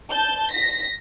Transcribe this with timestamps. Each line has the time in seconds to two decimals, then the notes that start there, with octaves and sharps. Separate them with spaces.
0.10 A5 G6
0.51 A#6 B6